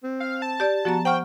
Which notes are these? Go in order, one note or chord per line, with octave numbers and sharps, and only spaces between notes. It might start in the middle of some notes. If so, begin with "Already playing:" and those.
C4
F5
A5
G4 D5
F3 B3 F#4 A#5
C5 F#5 G5 C#6 F6